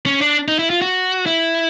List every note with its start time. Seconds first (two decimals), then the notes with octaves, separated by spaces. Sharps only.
0.06 C#4
0.21 D4
0.48 D#4
0.59 E4
0.70 F4
0.82 F#4
1.26 E4